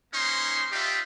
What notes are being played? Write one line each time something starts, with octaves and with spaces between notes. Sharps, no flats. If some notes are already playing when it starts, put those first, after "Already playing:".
A#3 C#4 D#4 C5 C6
D#4 F4 G4 D5 E5